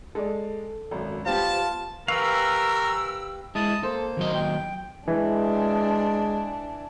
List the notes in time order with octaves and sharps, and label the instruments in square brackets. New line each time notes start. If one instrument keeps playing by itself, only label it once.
[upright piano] G#3 D5 [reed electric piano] A4
[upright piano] G#1 F#2
[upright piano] G3 B3 [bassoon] F4 [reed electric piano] G4 C5 [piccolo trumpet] A5
[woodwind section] E3 C#6 E6 [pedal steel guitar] G4 B4 F5 [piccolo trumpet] A#4
[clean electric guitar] G#3 E4 [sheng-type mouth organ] A5 D#6
[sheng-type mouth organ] A#3 C5 [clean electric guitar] A4
[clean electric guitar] D#2 F#3 D#5
[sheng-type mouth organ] G5
[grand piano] E3 [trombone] G#3 [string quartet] D4